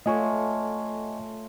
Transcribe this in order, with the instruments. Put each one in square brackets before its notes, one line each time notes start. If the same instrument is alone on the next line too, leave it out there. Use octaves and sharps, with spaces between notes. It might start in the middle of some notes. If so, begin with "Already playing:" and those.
[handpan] A3 F4 C#5 [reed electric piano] D#5 G#5 C#6